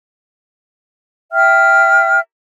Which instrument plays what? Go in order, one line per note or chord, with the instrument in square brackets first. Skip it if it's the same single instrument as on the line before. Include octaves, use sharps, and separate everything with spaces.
[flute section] E5 G5 F6